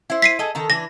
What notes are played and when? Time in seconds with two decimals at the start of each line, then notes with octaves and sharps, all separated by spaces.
0.10 E4 C5
0.22 B6 C7 D#7
0.39 G#4 A4 D#5
0.55 D#3 A4 A#5
0.70 E3 D4 A#6